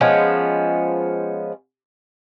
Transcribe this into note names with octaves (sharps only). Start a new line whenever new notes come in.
F3 G#3 B3 C#4